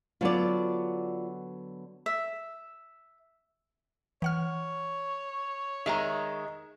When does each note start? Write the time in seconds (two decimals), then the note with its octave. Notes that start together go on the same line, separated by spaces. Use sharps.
0.21 D3 F#3 B3 F4 D5
2.06 E5
4.22 E3 C#5 F#5 F6
5.86 D#3 G#3 E5 A#5